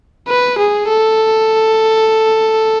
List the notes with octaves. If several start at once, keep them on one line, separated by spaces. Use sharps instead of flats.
B4
G#4
A4